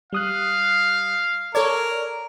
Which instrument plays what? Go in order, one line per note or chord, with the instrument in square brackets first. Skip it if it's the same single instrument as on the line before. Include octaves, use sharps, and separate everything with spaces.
[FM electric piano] G3 D#6 F#6 [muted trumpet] F5
[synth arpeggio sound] A4 C#5 G#6 [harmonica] A#4 [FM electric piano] D5